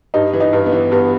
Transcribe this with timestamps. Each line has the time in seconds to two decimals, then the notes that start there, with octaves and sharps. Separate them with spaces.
0.14 G2 D#4
0.33 E3
0.40 D#4
0.53 G2
0.66 B3
0.72 E3
0.92 G2 B3